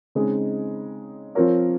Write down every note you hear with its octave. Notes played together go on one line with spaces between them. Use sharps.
C#3 G#3 C4 D#4 G#4
F3 C4 F4 A#4 C#5